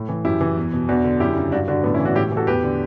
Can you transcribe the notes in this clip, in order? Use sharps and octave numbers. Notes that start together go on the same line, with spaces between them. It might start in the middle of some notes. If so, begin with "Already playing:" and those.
Already playing: A2
E3
F#2 E4 G4
E3
E2
B2
E2 D4 F#4
D3
F#2 E4 G4
C#3
G2 D4 F#4
D3 D4 F#4
A2 B3 D4
C#4 E4
E3
D4 F#4
A2 E4 G4
E3
F#4 A4
E2 G4 B4
D3